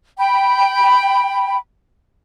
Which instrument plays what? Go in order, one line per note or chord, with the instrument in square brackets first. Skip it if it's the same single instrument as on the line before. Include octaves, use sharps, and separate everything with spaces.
[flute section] G5 B5